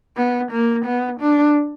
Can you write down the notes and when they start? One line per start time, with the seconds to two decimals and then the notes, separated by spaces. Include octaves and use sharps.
0.17 B3
0.52 A#3
0.85 B3
1.20 D4